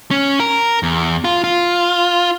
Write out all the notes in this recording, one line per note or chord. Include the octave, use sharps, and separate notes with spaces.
C#4
A#4
E2
F4
F4